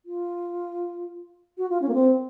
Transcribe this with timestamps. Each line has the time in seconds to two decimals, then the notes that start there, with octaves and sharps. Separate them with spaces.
0.05 F4
1.57 F#4
1.69 F4
1.81 C#4
1.88 A#3
1.93 C4